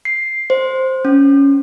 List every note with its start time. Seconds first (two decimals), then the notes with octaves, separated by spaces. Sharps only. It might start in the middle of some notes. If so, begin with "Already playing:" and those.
0.05 C7
0.50 C5
1.05 C#4